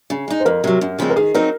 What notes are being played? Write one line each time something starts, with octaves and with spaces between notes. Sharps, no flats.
C#3
G#3 D#4
C5
F2 A#4
C3 F#3
F#2
C#3 F3 G#3 C4
A#4
D#3 G#4
F#3 C4 D#4 A#4